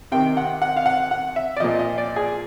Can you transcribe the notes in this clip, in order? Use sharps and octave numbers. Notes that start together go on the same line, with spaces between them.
C3 D#3 G5
F#5
F#5
F5
F#5
F#5
E5
D5
A#2 F3 D#5
D#5
D5
G#4